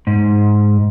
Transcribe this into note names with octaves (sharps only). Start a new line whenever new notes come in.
G#2